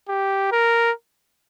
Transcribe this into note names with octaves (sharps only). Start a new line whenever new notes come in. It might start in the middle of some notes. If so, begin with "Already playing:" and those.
G4
A#4